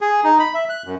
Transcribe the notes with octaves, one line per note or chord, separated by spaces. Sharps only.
G#4
D#4
B5
E5
F#6
F#2